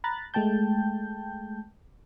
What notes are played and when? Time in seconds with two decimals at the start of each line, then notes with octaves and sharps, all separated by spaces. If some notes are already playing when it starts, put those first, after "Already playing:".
0.04 A#5 B5 F#6 A6
0.34 G#3 A3 G5 A5 G6